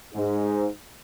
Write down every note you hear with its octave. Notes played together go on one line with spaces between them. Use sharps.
G#2